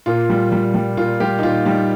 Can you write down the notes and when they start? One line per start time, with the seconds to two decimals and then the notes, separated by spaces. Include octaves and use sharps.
0.06 A#2 F4
0.30 G3
0.52 G3
0.74 G3
0.97 A#2 F4
1.20 G3 G4
1.39 D#4
1.43 A#2 F4
1.66 G3 D#4